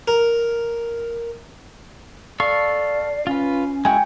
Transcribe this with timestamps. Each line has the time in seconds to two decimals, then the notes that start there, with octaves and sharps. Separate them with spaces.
0.08 A#4
2.40 A4 D5 F5 C#6 C7
3.27 C#4 F4 B4
3.85 G#3 E4 F#4 G5 G#5